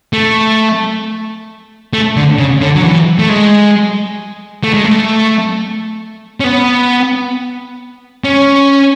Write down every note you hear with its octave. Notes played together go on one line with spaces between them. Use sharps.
A3
A3
D3
C#3
D3
F#3
E3
A3
G#3
A3
G#3
A3
C#4
B3
C#4